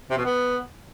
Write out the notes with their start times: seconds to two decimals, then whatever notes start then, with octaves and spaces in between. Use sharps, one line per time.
0.10 C3
0.18 B2
0.25 B3